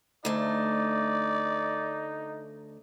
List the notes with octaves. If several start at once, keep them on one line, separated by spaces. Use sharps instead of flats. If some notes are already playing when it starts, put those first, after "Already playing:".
D2 A3 D#4 D5